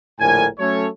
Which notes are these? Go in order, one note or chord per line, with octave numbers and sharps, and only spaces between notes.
A#1 A2 D3 A#4 G#5
F#3 A3 C#4 A4 C#5